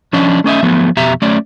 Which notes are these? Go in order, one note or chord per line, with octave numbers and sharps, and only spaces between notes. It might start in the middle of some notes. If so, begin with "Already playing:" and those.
F3 C#4 D4 D#5
A3 C#4 D#5 E5
F3 F#3 A3 B3
F2 B2 G4 E5 A#5
F#3 A3 C#4 D5